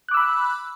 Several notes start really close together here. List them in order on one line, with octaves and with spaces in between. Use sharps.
F#6 D6 E6 B5